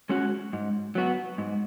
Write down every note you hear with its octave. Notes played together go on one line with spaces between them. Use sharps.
G#3 C#4 F#4
G#2
F#3 B3 F#4
G#2